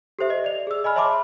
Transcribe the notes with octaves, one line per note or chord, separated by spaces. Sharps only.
G4 A4 C5 E5
D#5
D5 F7
G#4 E6
D#5 G#5 B5 F6
C#5 E5 A5 B5 C6 D6